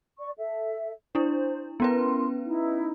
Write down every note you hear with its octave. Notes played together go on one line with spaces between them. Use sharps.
D5 C#6
A4 E5
D4 E4 C5
B3 C#4 E4 A#4 B4 C6
D#4 E4